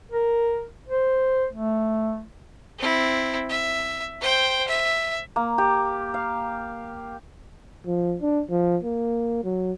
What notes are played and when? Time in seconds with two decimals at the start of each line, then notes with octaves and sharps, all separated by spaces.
0.12 A#4
0.89 C5
1.53 A3
2.79 C4 E4
3.50 E5
4.21 C5 G5
4.68 E5
5.36 A#3
5.58 G4
6.14 F5
7.86 F3
8.22 D4
8.50 F3
8.83 A#3
9.44 F#3